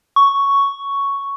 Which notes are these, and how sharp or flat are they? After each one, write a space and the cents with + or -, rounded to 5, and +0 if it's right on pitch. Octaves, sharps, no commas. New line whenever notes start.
C#6 +5